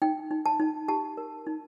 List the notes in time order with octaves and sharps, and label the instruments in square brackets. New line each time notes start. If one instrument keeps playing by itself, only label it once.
[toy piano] D#4 G5
D#4
A5
D#4
G4 A5
A#4
D#4